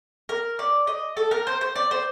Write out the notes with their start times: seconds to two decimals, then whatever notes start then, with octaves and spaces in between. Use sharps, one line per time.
0.29 A#4
0.59 D5
0.87 D#5
1.17 A4
1.31 A#4
1.47 C5
1.61 C5
1.76 D5
1.91 C5